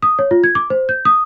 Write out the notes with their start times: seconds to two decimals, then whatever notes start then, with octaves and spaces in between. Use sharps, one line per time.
0.02 D#6
0.19 C#5
0.31 F4
0.44 G#6
0.55 D6
0.70 C5
0.89 G6
1.05 D#6